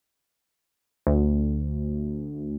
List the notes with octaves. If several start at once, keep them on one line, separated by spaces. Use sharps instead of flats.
D2